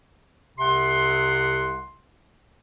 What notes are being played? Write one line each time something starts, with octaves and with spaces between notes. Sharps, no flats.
C2 C3 F#5 C6